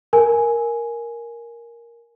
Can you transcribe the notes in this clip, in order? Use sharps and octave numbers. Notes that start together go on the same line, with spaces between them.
A#4 G#5